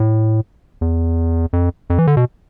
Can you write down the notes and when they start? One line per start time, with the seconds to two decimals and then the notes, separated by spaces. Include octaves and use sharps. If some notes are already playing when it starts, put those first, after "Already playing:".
Already playing: A2
0.81 E2
1.53 F2
1.90 F2
1.99 E3
2.07 D3
2.17 B2